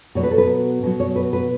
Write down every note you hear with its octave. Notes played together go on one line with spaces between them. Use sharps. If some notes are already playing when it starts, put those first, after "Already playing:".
B2 F#3 C#5
B4
A4
B4
B2 F#3
C#5
B4
B4